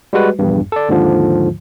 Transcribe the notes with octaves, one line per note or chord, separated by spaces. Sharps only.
G3 G#3 F#4 B4
A#1 E2 G2
A4 D5
D#2 G#2 D3 F3